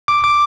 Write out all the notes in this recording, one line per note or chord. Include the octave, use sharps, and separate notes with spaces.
D6
D6